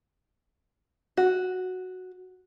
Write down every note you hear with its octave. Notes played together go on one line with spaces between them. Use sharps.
F#4